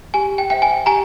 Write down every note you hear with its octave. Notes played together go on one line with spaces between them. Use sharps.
G4 G#5
G5
C5 E5 G5
G#5
G4 G#5 A#5